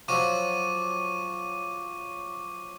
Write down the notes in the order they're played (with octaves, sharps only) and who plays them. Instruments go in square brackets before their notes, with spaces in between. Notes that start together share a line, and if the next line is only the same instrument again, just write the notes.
[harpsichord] F3 F#3 [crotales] C#6 D6 D#7